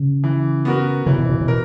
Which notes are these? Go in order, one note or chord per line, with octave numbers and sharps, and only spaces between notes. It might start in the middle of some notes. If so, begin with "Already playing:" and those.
Already playing: C#3
E3
B3 F#4 A#4
C#3 E3
B2
A#2
B2
A#4